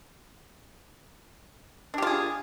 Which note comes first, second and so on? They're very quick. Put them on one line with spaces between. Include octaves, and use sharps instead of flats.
D4 G4 F4 G#4